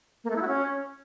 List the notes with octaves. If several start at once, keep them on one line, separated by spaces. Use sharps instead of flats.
A#3
A3
E4
F#4
C#4